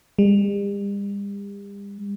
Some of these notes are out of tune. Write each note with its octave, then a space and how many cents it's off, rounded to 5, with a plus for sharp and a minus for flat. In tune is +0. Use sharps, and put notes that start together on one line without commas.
G3 +40